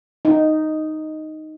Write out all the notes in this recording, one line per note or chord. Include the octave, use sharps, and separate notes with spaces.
D#4